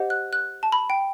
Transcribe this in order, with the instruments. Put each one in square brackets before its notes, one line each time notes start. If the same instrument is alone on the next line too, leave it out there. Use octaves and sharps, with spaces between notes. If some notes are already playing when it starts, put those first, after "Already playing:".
Already playing: [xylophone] G4 C5 D#5 F#5
F#6
F#6
A5
B5
G5